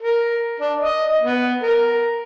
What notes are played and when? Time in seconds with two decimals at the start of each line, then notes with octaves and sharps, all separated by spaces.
0.02 A#4
0.60 D4
0.81 D#5
1.22 B3
1.63 A#4